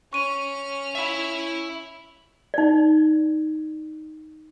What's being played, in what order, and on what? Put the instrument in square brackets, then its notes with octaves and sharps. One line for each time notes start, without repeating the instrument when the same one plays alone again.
[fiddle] C#4 F6 [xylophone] C#6 D#7
[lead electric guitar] E5 B5
[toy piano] D#4 D5